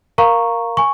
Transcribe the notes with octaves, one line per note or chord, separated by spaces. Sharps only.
A#4 F5 A#5 C#6
G#5 C#6